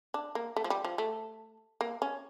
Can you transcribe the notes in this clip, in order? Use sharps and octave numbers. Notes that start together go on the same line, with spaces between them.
D4
A#3
A3
F3
G3
F3
A3
A#3
C#4